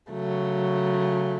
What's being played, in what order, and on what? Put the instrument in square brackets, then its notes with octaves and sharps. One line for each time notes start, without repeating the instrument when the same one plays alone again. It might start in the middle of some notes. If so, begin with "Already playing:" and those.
[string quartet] C#3 F#3 A3